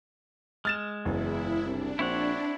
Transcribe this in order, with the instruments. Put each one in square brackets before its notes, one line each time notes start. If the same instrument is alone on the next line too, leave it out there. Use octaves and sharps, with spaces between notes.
[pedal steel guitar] G#3 [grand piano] F6 A6 E7
[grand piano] F#1 [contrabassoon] E2 [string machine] E4
[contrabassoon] C2 [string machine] D4
[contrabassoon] A#1 [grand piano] C4 [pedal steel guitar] E4 C#5 F#5